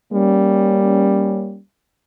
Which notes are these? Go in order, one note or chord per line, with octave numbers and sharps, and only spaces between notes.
G3 A#3 C#4